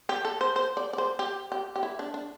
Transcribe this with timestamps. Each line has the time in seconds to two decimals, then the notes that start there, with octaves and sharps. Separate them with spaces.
0.09 G4
0.25 A4
0.41 C5
0.56 C5
0.77 D5
0.93 D5
0.98 C5
1.19 G4
1.52 G4
1.76 G4
1.83 E4
1.99 D4
2.14 D4